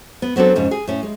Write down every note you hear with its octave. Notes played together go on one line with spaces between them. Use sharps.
B3
F#3 B3 C4 D4 A4
F2 G#2 C#3
G#4
A2 C#4
G#3